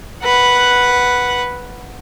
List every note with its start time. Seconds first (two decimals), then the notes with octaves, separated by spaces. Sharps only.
0.24 B4 F#5